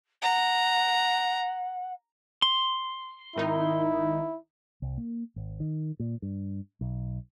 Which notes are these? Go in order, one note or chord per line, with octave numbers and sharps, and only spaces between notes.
F#5 A#5
C6
G#1 D#3 D#4 E4
C2
A#3
G#1
D#3
A#2
G2
B1